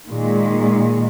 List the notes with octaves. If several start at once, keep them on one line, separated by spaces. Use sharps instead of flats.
A#2 D#3 G#3